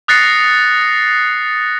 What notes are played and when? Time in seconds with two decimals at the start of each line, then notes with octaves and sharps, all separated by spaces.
0.08 D#6 F#6 A6 A#6 C7 C#7